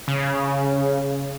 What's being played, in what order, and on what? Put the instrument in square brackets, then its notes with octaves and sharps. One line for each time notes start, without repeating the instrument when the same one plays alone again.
[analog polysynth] C#3